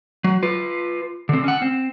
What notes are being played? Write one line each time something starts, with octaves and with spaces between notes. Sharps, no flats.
F#3
F4 B4
D3 C4
C#4 F#5
C4